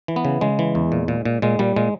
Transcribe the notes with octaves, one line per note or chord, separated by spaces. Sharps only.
E3
B3
C#3
C#3 G#3
E3
E2
A#2
A#2
A#2
A#2 G#3
A#2 G3
A#2 G#3